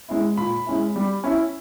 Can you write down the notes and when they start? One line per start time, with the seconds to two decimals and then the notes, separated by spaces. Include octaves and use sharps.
0.09 G#3 C#4 E4
0.37 A#2 B5
0.66 G#3 C#4 E4
0.96 G3
1.24 C#4 E4